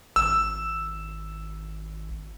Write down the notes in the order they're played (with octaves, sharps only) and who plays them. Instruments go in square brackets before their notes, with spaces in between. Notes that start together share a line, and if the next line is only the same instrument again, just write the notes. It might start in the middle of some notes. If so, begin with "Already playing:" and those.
[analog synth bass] G#1 [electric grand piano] E6